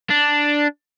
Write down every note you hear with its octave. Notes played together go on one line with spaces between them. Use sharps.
D4